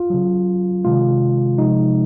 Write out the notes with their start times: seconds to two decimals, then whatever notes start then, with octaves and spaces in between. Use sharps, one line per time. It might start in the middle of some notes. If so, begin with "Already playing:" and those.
Already playing: F4
0.10 C#3 F#3
0.84 C3 D#3 G#3 F4
1.58 C3 F3 G#3 D#4